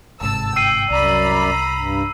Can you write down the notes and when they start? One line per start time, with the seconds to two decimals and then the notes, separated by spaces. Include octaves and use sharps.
0.21 G1 G#2 C3 A5 E6
0.56 G5 E6 C7 D#7
0.90 C2 F#2 D5 A#5 B5
1.77 G2